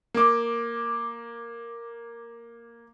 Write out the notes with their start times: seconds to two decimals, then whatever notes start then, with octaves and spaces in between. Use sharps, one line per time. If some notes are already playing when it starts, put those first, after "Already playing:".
0.14 A#3 D6